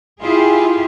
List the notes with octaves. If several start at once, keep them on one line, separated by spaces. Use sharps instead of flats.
E4 F4 G4 G#4